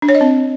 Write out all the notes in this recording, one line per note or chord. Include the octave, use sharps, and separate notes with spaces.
D4
C#5
D#5
C4